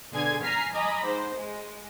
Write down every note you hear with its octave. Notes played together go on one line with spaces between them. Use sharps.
B2 D3 G#4 G#5 G#6
G#5 A#5 F6 B6 C7
D#5 G#5 A#5 B5 D6
G#2 C5
G#3